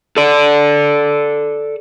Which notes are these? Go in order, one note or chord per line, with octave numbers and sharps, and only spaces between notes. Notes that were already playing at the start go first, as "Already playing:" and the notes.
A4 D5